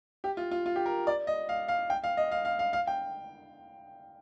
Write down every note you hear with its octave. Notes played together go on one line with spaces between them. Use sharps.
G4
F4
F4
F4
G4
A#4
D5
D#5
F5
F5
G5
F5
D#5
F5
F5
F5
F5
G5